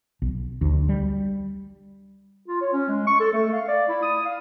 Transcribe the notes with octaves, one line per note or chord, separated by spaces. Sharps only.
B1
D2
G3
F4
C#5
C#4
G#3
C#6
A4
A3
F5
D5
E4
D#6
F5